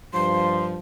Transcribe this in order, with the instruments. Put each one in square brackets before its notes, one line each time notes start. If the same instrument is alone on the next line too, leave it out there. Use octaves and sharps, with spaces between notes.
[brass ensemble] G2 F3 [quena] C6